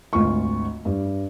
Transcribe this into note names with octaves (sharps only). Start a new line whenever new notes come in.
G#1 D2 F4 C#6
G2